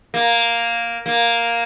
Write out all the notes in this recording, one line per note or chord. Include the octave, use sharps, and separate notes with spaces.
A#3
A#3